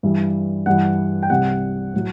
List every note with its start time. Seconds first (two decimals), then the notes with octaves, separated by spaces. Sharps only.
0.03 G2 E3 G3
0.66 G2 E3 G3 F#5
1.23 G5
1.30 C2 C3 G3 F#5
1.94 A2 F#3